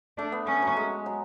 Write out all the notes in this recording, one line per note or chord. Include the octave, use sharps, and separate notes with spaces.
A3 D4
B3
A3 C#4
F#3
G#3
F#3